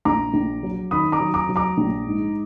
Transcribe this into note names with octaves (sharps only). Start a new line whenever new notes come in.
A#1 A#5 D6
A#1
F#3
D#3 B5 D#6
A#5 D6
F#3
A#5 D6
F#3
A#5 D6
A#1
G#2